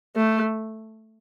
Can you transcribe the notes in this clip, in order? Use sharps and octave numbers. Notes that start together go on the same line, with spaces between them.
A3